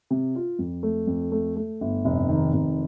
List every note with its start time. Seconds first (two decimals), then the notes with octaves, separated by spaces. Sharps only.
0.11 C3
0.35 F4
0.59 F2
0.83 A3
1.07 F2
1.32 A3
1.56 A3
1.81 G1
2.05 F1
2.29 D#3
2.53 F1